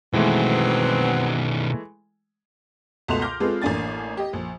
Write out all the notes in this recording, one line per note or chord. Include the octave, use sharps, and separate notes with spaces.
B2 D#3 E3 F#3 G#3 A3 B3 C4
C#2 B2 A3 F#4 C6 F7
C6 D6 F6 G6 A#6
G#3 C4 F4 G#4 A4 B4
A1 A#3 D4 G#5 A6
G4 D#5
A#1